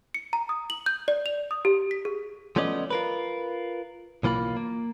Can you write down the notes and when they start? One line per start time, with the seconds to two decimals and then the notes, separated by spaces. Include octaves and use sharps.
0.14 C#7
0.33 A#5
0.49 D#6
0.70 F#7
0.86 G6
1.08 D5
1.26 F7
1.51 D#6
1.65 G4
1.91 B6
2.05 G#4
2.56 F3 A3 B3 C#4 D5 D#5
2.91 F4 A#4 B4
4.23 B1 E3 A#3 F4 B5
4.57 A#3